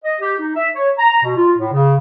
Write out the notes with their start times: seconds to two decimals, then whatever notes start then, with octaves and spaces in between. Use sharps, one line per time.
0.04 D#5
0.20 G4
0.38 D#4
0.56 E5
0.74 C#5
0.98 A#5
1.23 B2
1.36 F4
1.57 A2
1.73 C#3